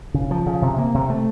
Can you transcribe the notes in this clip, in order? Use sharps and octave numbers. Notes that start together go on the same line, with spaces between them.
C#3
F3
C#3
C3
A#3
C3
A3